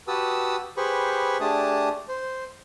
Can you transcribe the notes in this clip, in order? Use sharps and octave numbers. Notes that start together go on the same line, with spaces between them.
F#4 G4 B4 A5 D#6 E6
G4 G#4 B4 C5 B5 C#6
A3 D4 G4 G#4 A5 D#6
C5